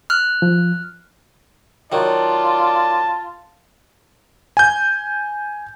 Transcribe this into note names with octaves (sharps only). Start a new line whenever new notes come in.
F6 F#6
F3
D#3 F#3 F4 D5 A5
G#5 G6